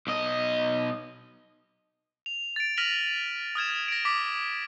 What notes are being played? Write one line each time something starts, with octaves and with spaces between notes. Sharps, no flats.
B1 D#5
F7
A6 D7
F6 A#6 B6 D#7 F7 F#7
D#6 F6 G#6 E7
A#6 D7
D6 B6